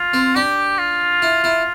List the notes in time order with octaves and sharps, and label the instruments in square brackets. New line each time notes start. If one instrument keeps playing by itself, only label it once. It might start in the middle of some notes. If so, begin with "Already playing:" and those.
Already playing: [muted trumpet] F4
[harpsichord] C4
[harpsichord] D4 [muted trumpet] G4
[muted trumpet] F4
[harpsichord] E4
E4